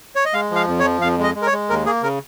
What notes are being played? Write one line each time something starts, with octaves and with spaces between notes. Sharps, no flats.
C#5
D#5
G#3 F5
F3 F5
F2
C#5
F3
F2 F5
G#3 D#5
G#3
A#4
C#5
G#3
D#2 A#4
A#3 G#4
C#3 A#4